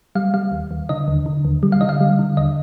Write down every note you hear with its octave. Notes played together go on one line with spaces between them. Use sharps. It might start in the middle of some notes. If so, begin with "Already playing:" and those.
G3 F5
G3 F5
D#2
D#2
D3 D#5
D#2
D3
D#2
G3
F5
D3 D#5
F5
G3
D3
D#2 D#5